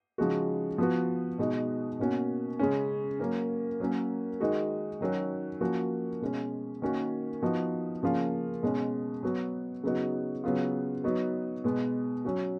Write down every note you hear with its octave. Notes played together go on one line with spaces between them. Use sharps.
C#3 F3 G#3 D#4 F#4
F3 B3 F#4
B2 G#3 D#4 F#4
B2 A#3 C#4 F#4
C#3 G#3 C#4
F#3 A#3 C#4
F#3 A#3 C#4
D#3 G#3 D#4 F#4
D#3 F#3 C#4 F#4
F3 A#3 C#4 F#4
B2 G#3 C#4
D#3 A#3 C#4 F#4
F3 B3 D#4 F#4
C#3 F3 A#3 C#4 F4
B2 G#3 C#4
F#3 B3 F#4
C#3 F#3 B3 D#4 F#4
C#3 F#3 B3 F4
F#3 B3 D#4 F#4
B2 G#3 B3
F#3 C#4 F#4